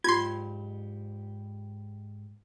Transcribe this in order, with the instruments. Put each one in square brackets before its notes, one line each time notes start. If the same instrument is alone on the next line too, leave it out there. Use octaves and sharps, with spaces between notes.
[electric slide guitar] G#2 G4 [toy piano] F4 [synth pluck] C6 G#6